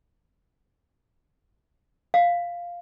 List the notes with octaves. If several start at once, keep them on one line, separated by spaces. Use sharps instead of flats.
F5